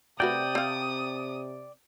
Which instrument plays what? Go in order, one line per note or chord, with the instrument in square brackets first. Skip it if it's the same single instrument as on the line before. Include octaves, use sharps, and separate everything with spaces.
[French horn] C3 [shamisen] A3 F#4 B4 [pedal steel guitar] D5 G5 [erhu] D#6
[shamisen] C4 F5